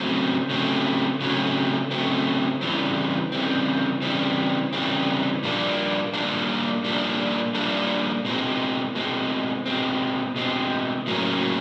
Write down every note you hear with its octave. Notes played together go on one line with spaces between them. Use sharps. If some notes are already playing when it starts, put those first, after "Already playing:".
Already playing: C#3 F#3 A3 C4
C#3 F#3 A3 C4
C#3 F#3 A3 C4
C#3 F#3 A3 C4
C#3 E3 G3 C4
C#3 E3 G3 C4
C#3 E3 G3 C4
C#3 E3 G3 C4
A#2 G3 A#3 D4
A#2 G3 A#3 D4
A#2 G3 A#3 D4
A#2 G3 A#3 D4
B2 G#3 C4
B2 G#3 C4
B2 G#3 C4
B2 G#3 C4
A2 F#3 A#3 C#4